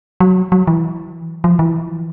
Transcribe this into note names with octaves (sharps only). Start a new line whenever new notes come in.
F#3
F#3
E3
F3
E3